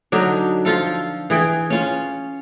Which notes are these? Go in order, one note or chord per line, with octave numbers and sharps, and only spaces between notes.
D3 F#3 D4 D#4
F3 F4 A4
E3 G#4 G5
C#4 F4